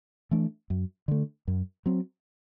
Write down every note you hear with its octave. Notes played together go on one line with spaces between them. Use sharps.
E3 A3 D4
F#2
D3 A3
F#2
F#3 C4